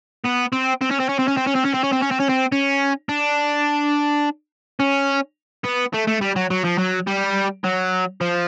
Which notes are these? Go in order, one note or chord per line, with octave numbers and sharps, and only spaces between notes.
B3
C4
C4
C#4
C4
C#4
C4
C#4
C4
C#4
C4
C#4
C4
C#4
C4
C#4
C4
C#4
C4
C#4
D4
C#4
B3
A3
A3
G3
F#3
F#3
F3
F#3
G3
F#3
F3